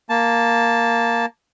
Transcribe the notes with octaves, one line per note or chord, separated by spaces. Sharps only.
A#3 A5